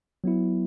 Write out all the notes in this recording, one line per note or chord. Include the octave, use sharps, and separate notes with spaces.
F#3 B3 E4